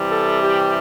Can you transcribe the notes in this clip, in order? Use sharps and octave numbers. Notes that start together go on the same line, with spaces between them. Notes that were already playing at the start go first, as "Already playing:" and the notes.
Already playing: C3 E3 G3
A4
G4